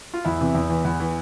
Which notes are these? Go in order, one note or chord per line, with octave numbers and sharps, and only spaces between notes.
F4
E2 E4
C3 E3
E2
E3
E2
E3